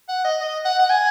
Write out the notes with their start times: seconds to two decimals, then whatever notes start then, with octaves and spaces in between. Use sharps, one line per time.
0.09 F#5
0.25 D#5
0.41 D#5
0.65 F#5
0.79 F#5
0.89 G#5